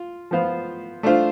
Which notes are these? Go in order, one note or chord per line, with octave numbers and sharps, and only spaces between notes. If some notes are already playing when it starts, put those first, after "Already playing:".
Already playing: F4
F3 B3 F4 C5 F5
A3 D4 F4 C5 F5